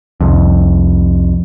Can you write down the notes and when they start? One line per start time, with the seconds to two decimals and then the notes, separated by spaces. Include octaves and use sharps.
0.21 C2 F2